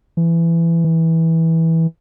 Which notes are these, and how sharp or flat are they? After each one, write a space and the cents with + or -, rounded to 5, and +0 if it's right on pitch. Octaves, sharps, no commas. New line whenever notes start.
E3 +20
E3 -15